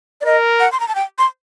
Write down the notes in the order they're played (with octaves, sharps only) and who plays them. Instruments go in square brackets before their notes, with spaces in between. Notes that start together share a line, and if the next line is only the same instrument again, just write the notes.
[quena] D5
[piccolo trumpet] A#4 [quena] D#5
[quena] F#5
C6
A#5
A5
G5
C6